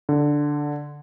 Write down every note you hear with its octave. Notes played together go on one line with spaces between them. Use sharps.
D3